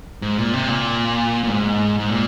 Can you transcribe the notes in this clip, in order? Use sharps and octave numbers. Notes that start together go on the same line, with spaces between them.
G#2
A#2
C3
A#2
A#2
G#2
G#2
A#2